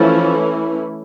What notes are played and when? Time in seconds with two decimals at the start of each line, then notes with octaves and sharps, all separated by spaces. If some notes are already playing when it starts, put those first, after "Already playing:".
Already playing: E3 F3 A3 C#4 E4